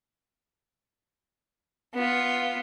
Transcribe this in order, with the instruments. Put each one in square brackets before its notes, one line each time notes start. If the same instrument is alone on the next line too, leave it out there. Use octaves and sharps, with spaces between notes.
[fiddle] B3 F4